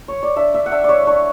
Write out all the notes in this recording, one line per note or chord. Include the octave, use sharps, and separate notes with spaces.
C#5
D5
D4 E5
D4 E5
F#5
D4 E5
G#3 C#5 D5
D4 C#5